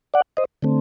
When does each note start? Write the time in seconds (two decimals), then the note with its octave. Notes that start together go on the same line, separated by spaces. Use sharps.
0.14 D5 F#5
0.37 C5 D#5
0.62 D3 A3 C4